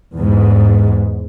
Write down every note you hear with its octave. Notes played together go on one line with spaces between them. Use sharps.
E2 G#2